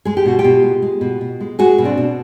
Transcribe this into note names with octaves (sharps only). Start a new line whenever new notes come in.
G#3 G#4
G4
B2 F#4
F4 G4
B2
G#3
G#3
B2
B2
G#3
G#3 F#4 G#4
B2
C4 D4
B2